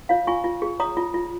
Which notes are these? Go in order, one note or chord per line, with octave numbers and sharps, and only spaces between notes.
F4 C#5 F5
F4 G#5 C#6
F4
G#4
C#5 A#5 D#6
F4
F4